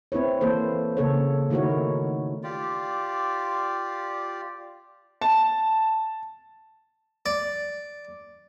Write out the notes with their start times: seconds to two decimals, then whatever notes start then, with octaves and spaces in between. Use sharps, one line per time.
0.12 C4 E4 B4 C#5
0.41 E3 A#3 A4 C5
0.97 C#3 A#3 A4 C#5
1.50 D#3 A3 E4 F#4 A#4 C#5
2.43 F4 G4 D5
5.21 A5
7.26 D5